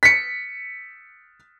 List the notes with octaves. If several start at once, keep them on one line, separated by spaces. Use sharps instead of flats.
B6 C#7